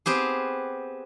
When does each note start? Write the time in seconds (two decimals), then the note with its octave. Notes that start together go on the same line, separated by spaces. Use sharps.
0.06 B3 C4 G4 G#4